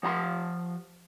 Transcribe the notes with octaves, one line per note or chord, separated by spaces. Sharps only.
F3 F#5 A#5 C6